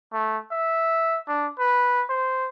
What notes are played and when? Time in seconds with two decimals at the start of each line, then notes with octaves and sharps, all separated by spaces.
0.13 A3
0.51 E5
1.28 D4
1.59 B4
2.10 C5